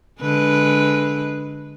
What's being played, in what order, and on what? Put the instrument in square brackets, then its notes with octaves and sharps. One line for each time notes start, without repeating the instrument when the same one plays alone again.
[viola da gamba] D3 G#3 B4